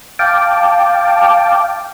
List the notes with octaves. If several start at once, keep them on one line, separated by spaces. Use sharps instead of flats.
F5 G5 A5 D6